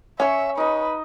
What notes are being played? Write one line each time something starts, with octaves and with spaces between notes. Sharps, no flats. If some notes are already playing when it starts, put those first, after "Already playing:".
C#4 C#5 E5
D#4 B4 D#5